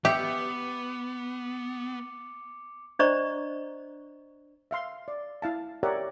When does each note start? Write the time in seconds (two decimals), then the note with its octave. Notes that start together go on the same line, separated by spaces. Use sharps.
0.05 B3 G4 E5 D6 C#7
2.99 D4 C5 D5 D#5 A#5 C#6
4.71 E5 F5 C6
5.08 D5
5.42 E4 F5 A5
5.83 G4 A#4 C#5 D5 E5 F#5